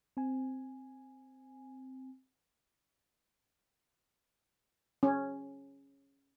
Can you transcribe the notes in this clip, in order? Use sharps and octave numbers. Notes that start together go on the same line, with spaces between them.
C4 G#5
C#4